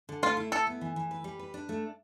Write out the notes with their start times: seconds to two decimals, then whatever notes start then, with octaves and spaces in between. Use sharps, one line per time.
0.09 D3
0.23 A3 F4
0.37 E4
0.52 E4 A4
0.67 B3
0.81 E3
0.96 E3
1.11 B4
1.24 G3
1.39 B4
1.54 D4
1.69 A3